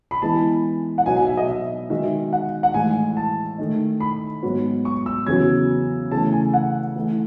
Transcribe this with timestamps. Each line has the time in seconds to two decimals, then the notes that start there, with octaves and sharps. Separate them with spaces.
0.11 B5
0.22 E3 G#3 B3 E4 A5
0.98 F#5
1.06 B2 F#3 B3 D#4 F#4 G#5
1.17 G#5
1.27 E5
1.37 D#5
1.48 E5
1.90 D#3 G#3 D#4 F#4 E5
2.33 F#5
2.63 F#5
2.74 A2 E3 G#3 G#5
3.17 A5
3.58 D#3 A3 D#4
4.00 B5
4.43 G#2 F#3 B3 F#4
4.85 C#6
5.06 E6
5.27 E2 C#3 F#3 B3 F#4 G#6
6.11 C#3 E3 A3 A5
6.33 G#5
6.54 F#5
6.96 E3 A3 E4